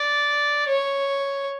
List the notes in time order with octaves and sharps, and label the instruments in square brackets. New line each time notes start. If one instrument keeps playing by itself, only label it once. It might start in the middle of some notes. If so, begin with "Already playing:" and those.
Already playing: [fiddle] D5
C#5